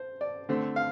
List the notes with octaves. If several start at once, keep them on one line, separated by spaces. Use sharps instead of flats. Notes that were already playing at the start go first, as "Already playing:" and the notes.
Already playing: C5
D5
D3 A3 C4
F5